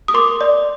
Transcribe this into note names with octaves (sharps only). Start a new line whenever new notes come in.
D#6
A#4 C6 D6
D5